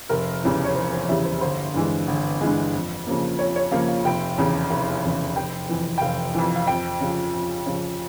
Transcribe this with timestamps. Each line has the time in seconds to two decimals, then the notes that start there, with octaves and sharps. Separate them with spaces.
0.09 F1 A#4
0.43 E2 C#3 E3 G3
0.64 C#5
0.75 F1 C5
0.93 C5
1.08 E2 C#3 E3 G3 E5
1.25 C5
1.41 G1 C5
1.74 G2 E3 G#3
2.07 G1
2.41 G2 E3 G#3
2.73 F2
3.07 C#3 F3 A#3
3.39 F2 C#5
3.56 C#5
3.71 C#3 F3 A#3 F5
3.88 F5
4.04 F1 G5
4.38 E2 C#3
4.70 F1
5.04 E2 C#3
5.36 F1 G5
5.69 F2 E3
5.98 G5
6.01 F1 F5
6.35 F2 E3
6.56 F5
6.67 F2 G5
7.01 C#3 F3
7.34 F2
7.66 C#3 F3